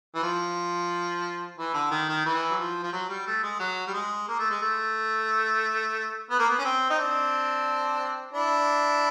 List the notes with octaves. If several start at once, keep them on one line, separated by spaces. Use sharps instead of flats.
E3
F3
E3
D3
D#3
D#3
E3
F#3
F3
F3
F#3
G3
A3
G#3
F#3
G3
G#3
A#3
A3
G#3
A3
B3
A#3
B3
C#4
C4
D#4
C4 D4
D4 E4